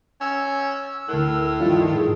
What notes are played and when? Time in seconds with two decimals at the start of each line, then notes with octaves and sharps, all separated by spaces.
0.21 C#4 E6
1.08 D2 A2 A#4 F#6
1.60 G2 D#3 F3 D4 F4
1.94 G#2 G#4